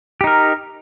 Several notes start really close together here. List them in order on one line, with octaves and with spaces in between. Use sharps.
G4 D#4 A#4